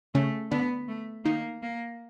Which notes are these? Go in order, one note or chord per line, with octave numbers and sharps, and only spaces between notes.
C#3 A3 C#4
D3 B3 D4
A3
D#3 A#3 D#4
A#3